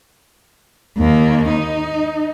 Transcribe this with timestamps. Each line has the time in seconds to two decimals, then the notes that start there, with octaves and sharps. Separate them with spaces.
0.97 D#2 A#3
1.49 D#4